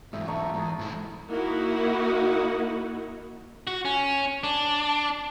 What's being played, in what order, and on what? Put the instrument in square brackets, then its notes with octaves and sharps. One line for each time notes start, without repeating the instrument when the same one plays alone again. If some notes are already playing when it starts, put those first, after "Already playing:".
[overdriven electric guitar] E2 G#2 [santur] E5
[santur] A3 A#5 C#6
[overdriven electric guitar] E2
G#2 E4
[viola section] A#3 D#4 E4 F#4
[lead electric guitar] F#4
C#4
D4